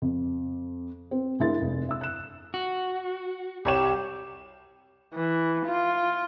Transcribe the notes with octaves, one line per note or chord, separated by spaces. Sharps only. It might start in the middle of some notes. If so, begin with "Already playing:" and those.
F2
C4
G2 G#3 E4 A#4 A6
F1
E5 E6
F#6 E7
F#4
C2 G4 C#5 E7
E3
F4